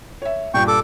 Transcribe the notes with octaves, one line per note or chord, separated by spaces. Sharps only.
C#5 E5
G2 A#2 G5 C#6
A4 D6